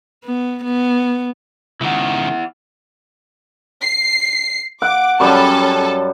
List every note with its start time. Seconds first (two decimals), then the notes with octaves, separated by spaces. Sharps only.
0.24 B3
0.64 B3
1.81 C#2 D#3 E4 F#5
3.81 C7
4.82 F#5 D6
5.20 F#2 G3 C#4 A4 A5 C#6